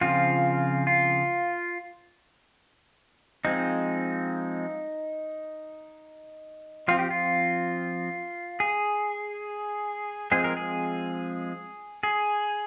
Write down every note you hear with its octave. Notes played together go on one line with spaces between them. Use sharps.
C#3 F3 C4 F4
F4
F3 G#3 C4 D#4
F3 C4 F4
G4
F4
G#4
F3 G#3 C4 G#4
A#4
G#4
G#4